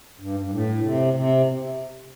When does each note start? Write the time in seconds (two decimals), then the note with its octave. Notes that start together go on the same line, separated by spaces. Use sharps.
0.20 G2
0.40 G2
0.52 A2
0.82 C3
1.14 C3